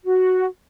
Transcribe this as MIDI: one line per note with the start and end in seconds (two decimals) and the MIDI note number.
0.04 0.45 66